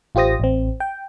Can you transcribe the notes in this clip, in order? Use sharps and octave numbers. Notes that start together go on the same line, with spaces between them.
A1 F4 G4 C5 D#6 A#6
A1 C4
G5